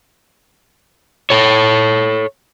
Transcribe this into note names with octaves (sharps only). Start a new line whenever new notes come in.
A4 C#5